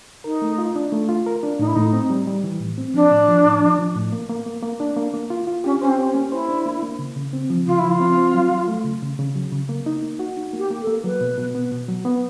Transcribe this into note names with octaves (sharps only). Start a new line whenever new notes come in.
D#4 A#4
A3
F4
D4
A3
F4
A#4
D4
A2 D#4
E4
A2 D#4
C4
G3
G3
E3
A2
C4
F3 D4
A2
F3
A2
F3
F3
A2
A#3
A#3
A#3
A#3
D4
A#3
A#3
F4
F4
C#4 G4
C#4 C5
C4
G4
C#4
A#3
E4 C5
D4
A#3
A#3
C#3
C#3
C4
F3
C#3 F4
E4
F3
F4
C4
C4
F#3
F#3
A3
C#3
C#3
C#3
F#3
C#3
A#3
D#4
A#3
F#4
D#4
A#3 G4
A#3
A4
A#3
F#3 B4
B2
B2
B3
B2
F#3
B3